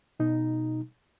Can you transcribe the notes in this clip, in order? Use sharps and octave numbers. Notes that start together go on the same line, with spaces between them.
B2 D#4